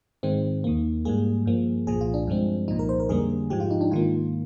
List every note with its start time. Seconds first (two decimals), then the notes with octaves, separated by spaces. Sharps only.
0.23 G#2 D#3 G#3 C4
0.64 D#2 D#3 A#3
1.05 G#2 G3 A#3 G#4
1.45 G2 F3 A#3
1.87 C2 A#2 F3 G#4
2.01 F4
2.14 D4
2.27 G2 F3 G#3 C4
2.68 C2 A#2 F3 D#4
2.79 A#4
2.89 C5
3.00 A#4
3.09 F2 D3 G3 A#3 G#4
3.50 G#2 F3 G#3 G4
3.60 F4
3.71 D#4
3.81 D4
3.91 G#2 D#3 A#3 F4